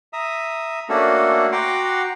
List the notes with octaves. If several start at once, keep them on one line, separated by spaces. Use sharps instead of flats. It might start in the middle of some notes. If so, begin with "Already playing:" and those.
E5 A#5 D#6
A3 A#3 C#4 D4 F#4 A4
F#4 F#5 G5 A#5 C6 D6